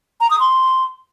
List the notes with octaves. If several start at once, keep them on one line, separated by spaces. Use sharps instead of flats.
A#5
D#6
C6